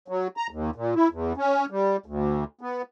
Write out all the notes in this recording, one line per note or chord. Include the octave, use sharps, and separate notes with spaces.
F#3
A#5
D#2
A#2
E4
E2
C#4
G3
D2
B3